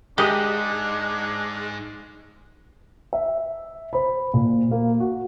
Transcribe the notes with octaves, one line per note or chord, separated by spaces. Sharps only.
G#2 G#3 D4 G4 D#5
E5
C5 B5
A#2
A#3
F#4